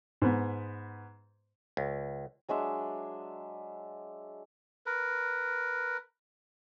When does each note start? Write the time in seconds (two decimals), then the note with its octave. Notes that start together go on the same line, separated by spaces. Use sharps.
0.22 G#2 B3
1.77 C#2
2.48 F#3 G#3 D4 E5
4.86 A#4 B4